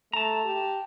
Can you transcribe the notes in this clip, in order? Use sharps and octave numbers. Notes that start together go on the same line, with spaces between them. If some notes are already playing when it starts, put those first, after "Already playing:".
A3 A5 A#5
G4